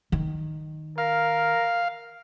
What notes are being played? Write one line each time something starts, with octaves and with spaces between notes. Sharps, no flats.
D#3
A#4 F5